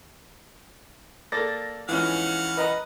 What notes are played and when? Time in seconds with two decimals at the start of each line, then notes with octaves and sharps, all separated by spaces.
1.32 A#3 A4 D5 A6 A#6
1.89 F2 G#2 E3 C#4 F5 F#5
2.57 B4 D#5 A#5